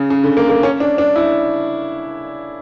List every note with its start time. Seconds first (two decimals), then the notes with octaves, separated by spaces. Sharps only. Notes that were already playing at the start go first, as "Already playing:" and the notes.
Already playing: C#3
0.10 C#3
0.23 D3
0.37 A#3
0.50 A#3
0.63 C#4
0.80 D4
0.98 D4
1.16 E4